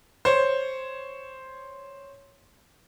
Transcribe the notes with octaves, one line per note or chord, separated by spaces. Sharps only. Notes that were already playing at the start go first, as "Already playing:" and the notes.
C5 C#5